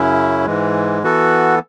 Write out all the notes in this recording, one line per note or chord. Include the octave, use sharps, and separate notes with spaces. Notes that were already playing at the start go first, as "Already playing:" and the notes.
Already playing: F#2 C#3 F#3 C#4 E4
G#2 E3 G#3
E3 B3 F#4 A4